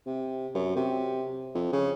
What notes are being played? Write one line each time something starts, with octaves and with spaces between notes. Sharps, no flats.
C3
F#2
C3
F2
C#3